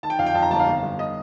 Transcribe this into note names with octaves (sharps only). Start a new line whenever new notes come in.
D#3 A5
G5
F2 F5
G5
F2 A5
A#5
G1 A5
F5
G1
G1
D#5